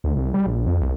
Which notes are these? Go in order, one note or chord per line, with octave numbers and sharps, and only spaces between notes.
D2
C2
G3
A#1
F2
C2